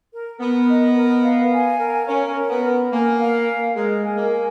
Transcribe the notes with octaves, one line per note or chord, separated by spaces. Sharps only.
A#4
B3 A#4
D#5
A#4
F5
G#5
A#4
C#4 A#4
A#4
B3
A#4
A#3 G#5
F5
A#4
G#3 A#4
G#5
A#3
G#5